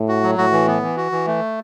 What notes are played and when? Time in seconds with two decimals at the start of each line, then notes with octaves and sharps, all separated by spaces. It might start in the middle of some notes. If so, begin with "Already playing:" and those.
Already playing: A2
0.08 F#4
0.23 F#3
0.38 A2 F#4
0.53 E3
0.67 B3
0.82 E3
0.97 F#4
1.12 E3
1.27 A3